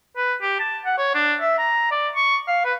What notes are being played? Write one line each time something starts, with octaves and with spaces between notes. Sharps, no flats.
B4
G4
A5
F#5
C#5
D4
E5
A#5
D5
C#6
F5
B4